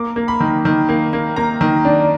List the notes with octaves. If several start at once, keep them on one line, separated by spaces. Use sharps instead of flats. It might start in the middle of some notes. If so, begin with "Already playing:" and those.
Already playing: A#3 D6
A#3
B5
D#3
D#3
A#3
A#3
A#3 A#5
D#3
D4